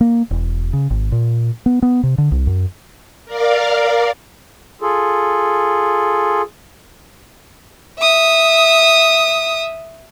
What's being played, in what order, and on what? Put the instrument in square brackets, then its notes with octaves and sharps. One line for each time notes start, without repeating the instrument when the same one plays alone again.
[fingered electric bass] A#3
E1
C#3
G#1
A#2
B3
B3
C3
D3
C2
F#2
[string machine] A#4 D5 F5
[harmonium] F4 G#4 A4
[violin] E5 D#6